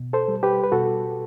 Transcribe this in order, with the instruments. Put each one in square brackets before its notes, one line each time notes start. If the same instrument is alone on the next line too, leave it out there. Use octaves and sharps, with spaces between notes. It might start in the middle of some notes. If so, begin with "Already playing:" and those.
Already playing: [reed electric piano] B2
A4 C5
G3
G4 B4
B4
B2 F#4 A4